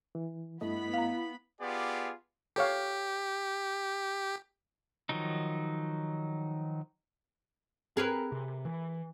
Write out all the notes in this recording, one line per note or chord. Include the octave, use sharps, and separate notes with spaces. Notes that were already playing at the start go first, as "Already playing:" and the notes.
E3
G2 A3 B3 E4 D#5 B5
F5 A#5
B3 F4 G4 G#4 D5
G4 A4 C#5 F5
D#3 F3 F#3 D#4
C4 G#4 A#4 B4
C3
E3